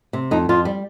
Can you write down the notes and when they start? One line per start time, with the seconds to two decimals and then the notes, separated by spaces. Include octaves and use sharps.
0.13 C3
0.31 F2 D#4
0.49 F2 F4
0.65 G3